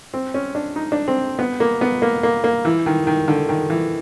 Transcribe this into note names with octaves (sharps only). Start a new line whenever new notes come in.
C4
C#4
D4
D#4
D4
C4
B3
A#3
B3
A#3
A#3
A#3
E3
D#3
D#3
D3
D#3
E3